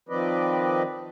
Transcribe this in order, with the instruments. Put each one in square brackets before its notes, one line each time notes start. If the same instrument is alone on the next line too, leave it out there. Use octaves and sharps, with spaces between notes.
[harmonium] D#3 F3 C4 B4 D5 D#5